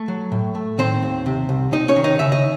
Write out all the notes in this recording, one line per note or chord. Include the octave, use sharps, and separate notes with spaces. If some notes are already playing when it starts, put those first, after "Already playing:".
Already playing: A3 A4
F#3
A2
A3
D#3 C4 C5
D#2
C3
C2
C3 D#4 D#5
C#4 C#5
D#3
D#4 D#5
C#3 E5
D#5